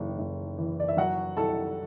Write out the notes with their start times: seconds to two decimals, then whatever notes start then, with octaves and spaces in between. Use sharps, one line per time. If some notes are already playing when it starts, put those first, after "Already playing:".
Already playing: F#1 E3
0.19 F#1
0.58 E3
0.80 D5
0.88 E5
0.97 F#3 F#4 F#5
1.37 C2 A4 A5